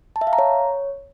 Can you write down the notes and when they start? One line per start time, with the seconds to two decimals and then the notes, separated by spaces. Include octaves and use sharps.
0.16 A5
0.21 E5
0.27 F5
0.33 A#5
0.38 C#5